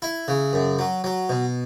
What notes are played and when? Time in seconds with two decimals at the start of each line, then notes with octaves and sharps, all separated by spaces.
0.02 E4
0.28 C#3
0.53 F#2
0.79 F#3
1.04 F#3
1.29 B2